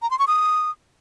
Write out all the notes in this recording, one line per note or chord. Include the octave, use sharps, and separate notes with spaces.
A#5
C6
C#6
D#6